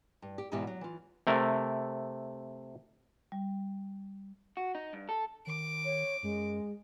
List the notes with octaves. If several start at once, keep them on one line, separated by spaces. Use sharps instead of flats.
G2
G4
E2 G#2 B2 E3 G4 E5
F#3
E3 F4
C3 A3 A#4
G3
F#4
D#4
G2
A4
D#3 D6
C#5
F#2 G#3